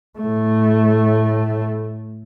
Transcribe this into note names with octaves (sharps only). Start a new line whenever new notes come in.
A2 A3